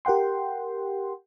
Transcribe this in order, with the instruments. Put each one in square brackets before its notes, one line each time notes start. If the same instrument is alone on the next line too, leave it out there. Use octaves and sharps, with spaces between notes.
[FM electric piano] G4 A#4 F#5 G5 C6